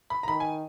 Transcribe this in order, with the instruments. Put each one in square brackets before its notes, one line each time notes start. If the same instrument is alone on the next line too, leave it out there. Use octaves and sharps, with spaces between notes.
[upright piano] B5
A#5
[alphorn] D#3 [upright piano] B5
[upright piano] G#5